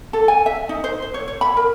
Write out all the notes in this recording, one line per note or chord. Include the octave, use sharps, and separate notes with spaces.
A4
G#5
E5
D#4
C5
C5
C#5
C#5
B5
A#4